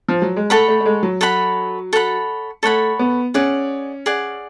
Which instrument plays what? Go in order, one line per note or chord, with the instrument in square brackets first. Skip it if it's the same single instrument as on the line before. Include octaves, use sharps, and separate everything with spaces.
[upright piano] F3
F#3
G#3
[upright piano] A3 [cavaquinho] A4 C#5 F#5 B5
[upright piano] A3
A3
G#3
F#3
[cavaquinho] A4 C#5 F#5 B5
A4 C#5 F#5 B5
[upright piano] A3 [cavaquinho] A4 C#5 F#5 B5
[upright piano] B3
[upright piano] C#4 [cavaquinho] G#4 D5 F#5
[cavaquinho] G#4 D5 F#5